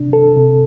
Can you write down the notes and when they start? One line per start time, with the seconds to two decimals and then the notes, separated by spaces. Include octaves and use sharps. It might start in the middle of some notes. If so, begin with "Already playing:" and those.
Already playing: C3 D4
0.13 A4
0.36 C3